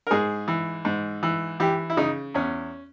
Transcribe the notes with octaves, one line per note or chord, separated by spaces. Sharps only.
A#4
G#2 G#4
E3
G#2
E3
E3 G4
E4
C#3 D#4
E2 C#4